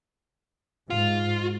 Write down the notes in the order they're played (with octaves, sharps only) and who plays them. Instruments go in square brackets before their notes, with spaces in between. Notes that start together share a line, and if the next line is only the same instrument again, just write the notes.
[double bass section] G#2 [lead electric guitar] F4